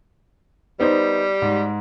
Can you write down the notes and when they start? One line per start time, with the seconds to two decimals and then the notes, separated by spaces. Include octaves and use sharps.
0.80 G3 B3 D#4 C5
1.42 G#2